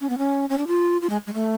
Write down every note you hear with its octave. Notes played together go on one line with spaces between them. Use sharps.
C#4
B3
C#4
C#4
D4
F4
F4
G#3
G#3
A3